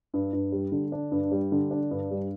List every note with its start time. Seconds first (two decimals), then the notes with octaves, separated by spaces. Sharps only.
0.14 G2
0.33 G2
0.52 G3
0.72 D3
0.92 D4
1.12 G2
1.32 G3
1.52 D3
1.71 D4
1.91 G2
2.11 G3